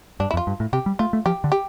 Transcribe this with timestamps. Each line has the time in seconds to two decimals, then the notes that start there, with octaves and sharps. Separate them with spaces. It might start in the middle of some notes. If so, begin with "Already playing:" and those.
0.20 G2 D4
0.31 E4
0.34 F2
0.37 F4
0.47 G2
0.60 A2
0.73 C3 G4
0.86 G3
0.99 A3 F4
1.13 A3
1.26 F3 G4
1.44 D3
1.52 G4